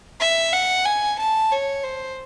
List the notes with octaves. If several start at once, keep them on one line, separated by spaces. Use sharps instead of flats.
E5
F#5
G#5
A5
C#5
C5